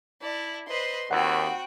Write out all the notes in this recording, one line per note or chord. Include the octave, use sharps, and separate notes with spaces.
E4 D5 A5
B4 C5 D#5 C6
D#2 C4 F#4 F#5 G5 B5